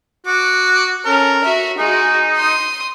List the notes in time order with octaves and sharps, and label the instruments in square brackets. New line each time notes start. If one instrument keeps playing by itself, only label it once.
[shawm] F#4 [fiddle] D6
[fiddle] C#4 A4 [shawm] A#4
[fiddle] F#4 E5
[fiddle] G#3 F#4 [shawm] D#4
[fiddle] C6 D#6